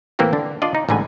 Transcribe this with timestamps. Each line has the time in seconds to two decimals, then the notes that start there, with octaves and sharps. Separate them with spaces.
0.19 A2 E3 A#3 C4 E4 G4
0.33 D3 D4
0.62 D4 F4 D5 D#5
0.75 D#4
0.89 A1 G#2 D3 B4 G#5